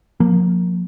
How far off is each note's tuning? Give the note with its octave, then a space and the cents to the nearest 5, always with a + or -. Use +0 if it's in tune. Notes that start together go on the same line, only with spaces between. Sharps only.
F3 +40 A#3 +0